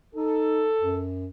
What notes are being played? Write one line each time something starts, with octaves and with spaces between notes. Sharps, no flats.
D#4 A4
F#2